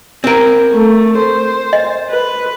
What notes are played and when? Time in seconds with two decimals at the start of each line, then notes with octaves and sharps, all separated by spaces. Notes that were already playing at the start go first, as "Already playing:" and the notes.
0.24 C4 A#4
0.73 A3
1.18 C5
1.73 D#5
2.10 B4